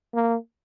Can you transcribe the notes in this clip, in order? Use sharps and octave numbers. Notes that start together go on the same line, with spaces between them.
A#3